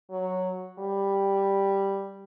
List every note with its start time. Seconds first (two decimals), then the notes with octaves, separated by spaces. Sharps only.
0.11 F#3
0.79 G3